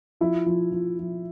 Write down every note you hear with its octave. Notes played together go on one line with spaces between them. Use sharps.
F3 E4
F3
F3
F3